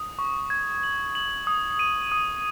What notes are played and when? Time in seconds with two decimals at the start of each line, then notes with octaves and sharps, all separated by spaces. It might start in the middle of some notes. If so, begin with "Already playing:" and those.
Already playing: D#6
0.19 C#6
0.50 G#6
0.83 F#7
1.15 F#7
1.47 D#6
1.79 D#7
2.12 D#6